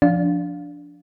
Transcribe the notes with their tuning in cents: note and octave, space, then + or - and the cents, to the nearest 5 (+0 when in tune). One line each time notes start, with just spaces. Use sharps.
F3 +0 D4 -15 F5 +15